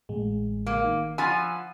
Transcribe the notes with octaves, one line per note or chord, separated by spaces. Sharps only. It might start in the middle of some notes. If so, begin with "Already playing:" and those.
A1 G#3
A#3
D#3
F3 F4 F#5 G#5 B5 E6